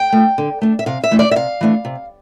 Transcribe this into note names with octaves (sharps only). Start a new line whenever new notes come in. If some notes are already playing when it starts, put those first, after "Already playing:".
Already playing: G5
A3 D4
D3
A3 D4
E5
C3 F5
E5
E3 A3 D4
D5
E5
C3 F5
E3 A3 D4
C3